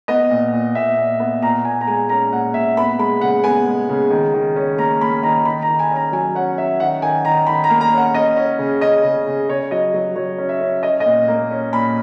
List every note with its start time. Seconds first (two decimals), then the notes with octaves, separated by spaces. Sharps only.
0.08 B3 D#5
0.30 A#2
0.53 A#2
0.75 A#2 E5
0.97 A#2
1.20 B3
1.42 A#2 A#5
1.64 A#2 G#5
1.81 A#5
1.87 G#3 G#5
2.09 C#4 A#5
2.32 A#2 F#5
2.54 A#2 E5
2.77 B3 B5
2.99 G#3 B5
3.21 C#3 F#5
3.44 B3 G#5
3.66 G#3
3.89 C#3
4.11 D#3
4.34 D#3
4.56 C#4
4.78 A#3 A#5
5.01 A#3 B5
5.23 D#3 A#5
5.45 D#3 B5
5.62 A#5
5.68 D#3
5.79 G#5
5.91 C#4
5.96 A#5
6.12 F#3 G#5
6.35 C#4 F#5
6.58 C#4 E5
6.80 D#3 F#5
7.02 D#3 G#5
7.25 D#3 A#5
7.47 D#3 B5
7.64 A#5
7.70 A#3
7.81 A#5
7.91 C#4
7.97 F#5
8.14 C#4 D#5
8.36 C#4
8.59 C#3
8.81 C#3 D#5
9.03 C#3
9.27 C#3
9.49 C#3 C#5
9.71 F#3 D#5
9.94 F#3
10.16 F#3 C#5
10.38 C#4
10.49 E5
10.61 C#4
10.83 C#4 D#5
11.00 D#5
11.05 A#2
11.28 A#3
11.51 C#4
11.73 A#2 B5